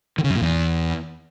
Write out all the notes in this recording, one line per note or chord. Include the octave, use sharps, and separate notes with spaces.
D#3
C#3
F#2
A#2
E2